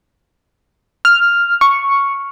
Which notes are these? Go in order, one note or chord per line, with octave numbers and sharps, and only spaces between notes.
F6
C#6